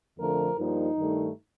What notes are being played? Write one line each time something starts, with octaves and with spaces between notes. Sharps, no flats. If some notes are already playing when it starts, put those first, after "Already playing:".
F2 D3 F3 A3 A#4
G2 F3 A#3 D#4
G2 D#3 A3